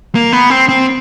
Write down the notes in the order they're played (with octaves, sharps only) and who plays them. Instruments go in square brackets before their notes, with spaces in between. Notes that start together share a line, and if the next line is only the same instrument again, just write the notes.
[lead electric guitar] A#3
B3
C4
C4